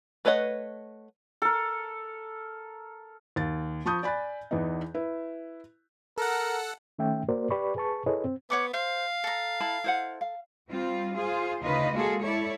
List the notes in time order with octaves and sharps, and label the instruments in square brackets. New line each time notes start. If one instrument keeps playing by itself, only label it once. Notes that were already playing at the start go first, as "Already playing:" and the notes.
[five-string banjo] A3 B4 C#5 D#5 F#5
[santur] A4 A#4
[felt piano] D#2 A6
F3 A5 B5 C#6 D#6 G6
D5 G#5 B5 F#6 A6
E2 E3 B3 D#4
E4 B4
[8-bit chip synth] A4 F#5 [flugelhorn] A#4
[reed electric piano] D#3 A3 C#4 E5 G5
A#3 F#4 A#4 C5 D5
G4 B4 D5 B5 C#6
G#4 B4 A5 C#6
E4 G#4 A4 B4 C#5 D#5
C4
[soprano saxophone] B3 [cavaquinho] C#5 F#5 D6
[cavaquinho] C5 [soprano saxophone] F5
[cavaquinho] A4 A#5
[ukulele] E4 A5 B5
E4 C5 F#5
F5
[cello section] G3 C4 F4
F4 G#4 C5
D2 C#3 D#4 F4 B4 D#5
G#3 A#3 F4 F#4 G#4 A4
E4 A4 C#5 D5